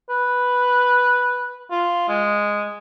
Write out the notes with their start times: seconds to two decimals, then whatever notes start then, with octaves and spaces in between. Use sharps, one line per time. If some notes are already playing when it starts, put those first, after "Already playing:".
0.09 B4
1.71 F4
2.09 G#3